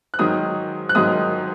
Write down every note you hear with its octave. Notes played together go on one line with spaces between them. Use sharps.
F#6
G#2 D#3 F#3 D#6
F#6
G#2 D#3 F#3 D#6